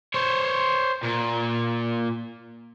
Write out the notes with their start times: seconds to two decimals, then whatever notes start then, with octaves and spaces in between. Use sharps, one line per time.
0.14 C5 C#5
1.03 A#2